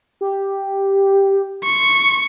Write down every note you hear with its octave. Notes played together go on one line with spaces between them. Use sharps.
G4
C6 C#6